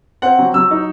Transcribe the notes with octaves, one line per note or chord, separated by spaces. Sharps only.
C4 F#5
F#3
F#3 E6
D#4